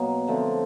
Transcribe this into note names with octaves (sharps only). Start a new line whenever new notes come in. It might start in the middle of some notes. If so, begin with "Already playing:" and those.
Already playing: B2 F#3 A#3
D3 F3 A3 C4